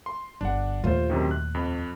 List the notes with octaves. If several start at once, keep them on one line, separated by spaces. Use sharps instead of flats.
C6
G1 D4 F#5
D#2 A#2 A3 F4 C5
F#2 C3 D#3
F#6
F2